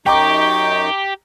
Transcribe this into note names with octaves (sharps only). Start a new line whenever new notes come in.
F#2 D#4 G4 G5 A#5 C#6 D6